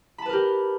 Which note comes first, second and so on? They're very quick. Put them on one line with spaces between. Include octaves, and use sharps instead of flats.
B5 A5 B4 A#4 G4